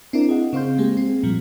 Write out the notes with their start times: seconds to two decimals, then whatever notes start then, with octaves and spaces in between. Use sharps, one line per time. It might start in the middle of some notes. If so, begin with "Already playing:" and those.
0.13 C4 D4 E4 A#4 D5
0.29 G#4 D#5 F5 F#5
0.53 C#3 C4 F5 C6 G6
0.78 G#3 A#3 G4 G#4
0.97 C4
1.23 A#2 F3 G3